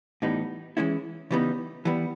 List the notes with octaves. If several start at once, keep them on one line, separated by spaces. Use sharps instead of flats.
A2 E3 G3 B3 D#4
E3 G#3 C#4 E4
C#3 E3 G3 B3 D#4
E3 G3 B3